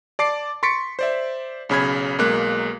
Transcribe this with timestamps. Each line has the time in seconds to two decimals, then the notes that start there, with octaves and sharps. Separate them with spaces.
0.19 D5 A5 D6 A6 C7 D7
0.63 C6 C#6 A6 B6 C#7 D7
0.99 C5 D5 E5
1.69 B1 C#3 B5 G#6
2.19 B1 G#3 A#3 F#6